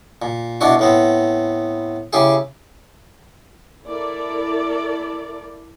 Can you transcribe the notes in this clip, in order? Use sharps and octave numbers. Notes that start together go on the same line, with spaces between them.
A#2
B2 D4 E4 F#4
A2 B3 C4
C#3 E4 G4 G#4
E4 A4 A#4 D5